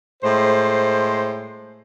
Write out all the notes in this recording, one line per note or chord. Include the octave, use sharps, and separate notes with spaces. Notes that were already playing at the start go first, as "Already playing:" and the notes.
A2 G#3 C5